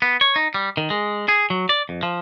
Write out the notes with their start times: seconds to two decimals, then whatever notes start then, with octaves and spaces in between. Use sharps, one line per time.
0.02 B3
0.21 C#5
0.36 D#4
0.54 G3
0.77 D#3
0.90 G#3
1.28 G#4
1.50 F#3
1.69 D5
1.89 F2
2.03 F3